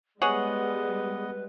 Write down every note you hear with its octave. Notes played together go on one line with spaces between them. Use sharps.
G3 G#3 B3 G#4 B4 C#5 D#5 F#5